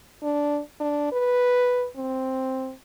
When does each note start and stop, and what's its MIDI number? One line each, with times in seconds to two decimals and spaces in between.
0.23 0.60 62
0.80 1.12 62
1.12 1.87 71
1.96 2.73 60